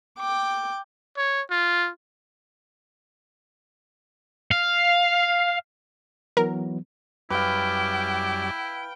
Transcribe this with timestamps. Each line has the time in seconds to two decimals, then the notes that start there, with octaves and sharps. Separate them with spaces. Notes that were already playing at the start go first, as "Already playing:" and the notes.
0.19 G5 D6
1.17 C#5
1.51 F4
4.51 F5
6.37 E3 F#3 B3 A#4
7.30 F#2 G3 E4 B4 F5 G5 D6